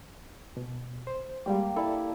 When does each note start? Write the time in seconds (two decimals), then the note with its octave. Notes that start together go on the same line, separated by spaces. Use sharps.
0.57 B2
1.07 C5
1.46 G3 G#3 A#3 G4
1.76 E4 A4 D5 A5